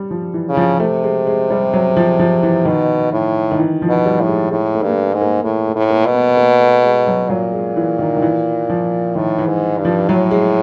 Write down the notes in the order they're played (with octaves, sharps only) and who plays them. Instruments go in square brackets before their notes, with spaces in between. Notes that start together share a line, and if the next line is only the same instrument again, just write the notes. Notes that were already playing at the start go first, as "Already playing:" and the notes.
Already playing: [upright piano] G3
F3
E3
[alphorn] C#3
[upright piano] F3
[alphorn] C3 [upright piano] A3
[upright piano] G#3
G#3
G3
F#3
F3
F3
E3
[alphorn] B2 [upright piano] D#3
[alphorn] A2
[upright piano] D#3
E3
F3
[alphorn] B2
[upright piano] G3
[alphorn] A2
[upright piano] G#3
[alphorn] A2 [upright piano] G#3
[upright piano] A3
[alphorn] G2 [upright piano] A#3
[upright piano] A3
[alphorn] G#2
[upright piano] A#3
[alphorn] A2 [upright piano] A3
[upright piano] A3
[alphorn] A2
[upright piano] A#3
[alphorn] B2
[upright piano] B3
A#3
A3
G#3
F#3
[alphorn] A#2 [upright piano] F#3
[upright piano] G#3
E3
D#3
D#3
E3
F3
[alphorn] A2 [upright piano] D#3
[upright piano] E3
[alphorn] G#2
G2
[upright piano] F3
[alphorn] A2 [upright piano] F#3
[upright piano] G#3